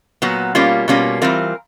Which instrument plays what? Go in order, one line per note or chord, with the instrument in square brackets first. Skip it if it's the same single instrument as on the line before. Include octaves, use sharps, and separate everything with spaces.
[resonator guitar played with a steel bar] A#2 F#3 B3
B2 G3 A#3 C#4 F4
B2 G3 A#3 C#4 F4
E3 G3 C4 F4 A#4